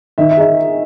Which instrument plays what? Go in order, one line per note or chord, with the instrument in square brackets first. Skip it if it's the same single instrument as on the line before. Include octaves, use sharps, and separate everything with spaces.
[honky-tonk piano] D#3 [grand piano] E5
[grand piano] E5
[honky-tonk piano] D#4 G#4